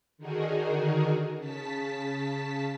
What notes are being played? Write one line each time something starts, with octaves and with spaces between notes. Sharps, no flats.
D3 D#3 D#4 F#4 G#4 A#4
C#3 A5 B6